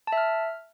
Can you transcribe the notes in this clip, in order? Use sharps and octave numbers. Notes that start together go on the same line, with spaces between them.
A5
E5
F6